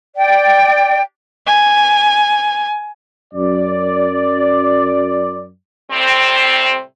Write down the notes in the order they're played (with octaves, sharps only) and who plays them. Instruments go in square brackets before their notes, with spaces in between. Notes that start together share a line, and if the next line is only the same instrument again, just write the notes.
[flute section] D5 G5
[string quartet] G#5
[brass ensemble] F#2 D5
[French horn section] A2 C3 G3 C4